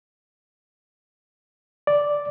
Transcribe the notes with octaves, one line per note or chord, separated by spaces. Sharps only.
D5